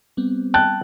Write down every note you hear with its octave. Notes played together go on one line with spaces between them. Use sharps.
G3 B3 C4
G5 A5 F#6